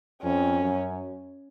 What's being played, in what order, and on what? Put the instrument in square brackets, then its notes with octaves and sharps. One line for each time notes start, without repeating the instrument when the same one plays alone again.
[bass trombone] F2 [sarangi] C#4
[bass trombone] F#2